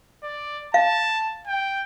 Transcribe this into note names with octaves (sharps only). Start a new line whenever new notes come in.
D5
F5 A5
G5